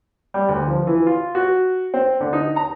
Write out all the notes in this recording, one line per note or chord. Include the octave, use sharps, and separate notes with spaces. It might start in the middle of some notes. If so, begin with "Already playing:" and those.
G3
D2
F3
E3
F4
F#4
C4
D3
D#4
A#5